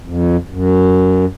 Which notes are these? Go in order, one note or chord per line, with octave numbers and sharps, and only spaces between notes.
F2
F#2